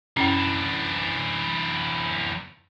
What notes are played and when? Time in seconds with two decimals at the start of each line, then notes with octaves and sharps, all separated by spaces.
0.17 F#2 E3 C#4 D4